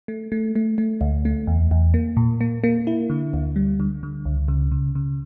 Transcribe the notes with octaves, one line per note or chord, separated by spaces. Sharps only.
A3
A3
A3
A3
D2
A3
E2
E2
A#3
A#2
A#3
A#3
E4
D3
D2
G3
D3
D3
C#2
C#3
C#3
C#3